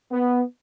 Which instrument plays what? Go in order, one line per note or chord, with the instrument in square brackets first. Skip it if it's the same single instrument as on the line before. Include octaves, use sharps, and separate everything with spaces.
[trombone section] B3